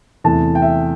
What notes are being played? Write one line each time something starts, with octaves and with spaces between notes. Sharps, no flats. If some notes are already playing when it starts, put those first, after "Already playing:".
E2 C3 E3 A3 A5
G5
E5